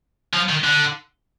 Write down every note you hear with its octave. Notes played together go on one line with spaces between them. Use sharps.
F3
D#3
D3